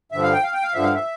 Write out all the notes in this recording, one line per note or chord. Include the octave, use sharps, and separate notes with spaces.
G2 D3 F3 E5
F5
G5
F5
G5
F5
G2 D3 F3 E5
F5
E5